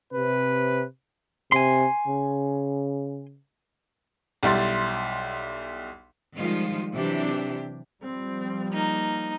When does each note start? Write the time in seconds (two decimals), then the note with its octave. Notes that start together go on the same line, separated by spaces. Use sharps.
0.13 C3 B4
1.52 C3 G#5 C6
2.07 C#3
4.43 B1 G3 E4 C6 A6
6.36 D#3 F3 G3 G#3 F4
6.94 C3 E3 F#3 D4 G4
8.03 F3 G3 C4
8.73 A#3 D#4